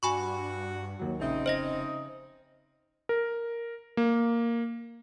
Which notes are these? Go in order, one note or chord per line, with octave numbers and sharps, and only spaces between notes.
G2 F#4 G#5 B5 C#6
D#2 F#3
A#1 C#3 C4 D#4 E5
F1 C5 D#5 A#6
A#4
A#3